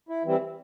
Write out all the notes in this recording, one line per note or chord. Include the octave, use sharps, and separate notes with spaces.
E4
E3 G3 C4 E4